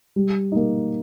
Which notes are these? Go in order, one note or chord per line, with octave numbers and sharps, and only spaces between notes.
G3
A#3 D#4